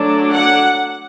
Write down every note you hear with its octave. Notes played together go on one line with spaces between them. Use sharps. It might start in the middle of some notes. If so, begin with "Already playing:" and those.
Already playing: F#3 A3 D4
F#5